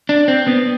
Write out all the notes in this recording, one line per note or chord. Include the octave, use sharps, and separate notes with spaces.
D4
C4
B3